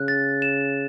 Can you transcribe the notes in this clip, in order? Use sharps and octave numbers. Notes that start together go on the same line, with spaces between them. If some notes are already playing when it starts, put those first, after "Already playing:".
Already playing: C#3 F#6
A6
E7